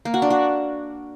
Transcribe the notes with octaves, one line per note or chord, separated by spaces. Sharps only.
A#3
F#4
D4
F#4